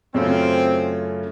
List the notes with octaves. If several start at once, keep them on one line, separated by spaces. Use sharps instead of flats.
F#2 C#3 A3 C4 C#4 F4